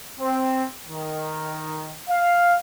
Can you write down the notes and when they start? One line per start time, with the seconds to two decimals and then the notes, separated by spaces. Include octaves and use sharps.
0.20 C4
0.89 D#3
2.09 F5